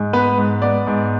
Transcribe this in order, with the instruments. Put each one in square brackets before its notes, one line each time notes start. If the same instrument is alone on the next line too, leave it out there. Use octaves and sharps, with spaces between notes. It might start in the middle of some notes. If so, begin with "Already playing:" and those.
Already playing: [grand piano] G#2
B3 B4
G#2
B3 D5
G#2